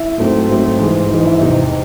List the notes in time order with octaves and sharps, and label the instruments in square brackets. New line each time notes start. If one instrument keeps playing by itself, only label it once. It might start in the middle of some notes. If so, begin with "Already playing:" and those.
Already playing: [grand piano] E4
G#2 F#3 A3 C4
G#2 F#3 A3 C4
G#2 E3 G#3
G#2 E3 G#3 D#4
E4
E2 C3 E3 D#4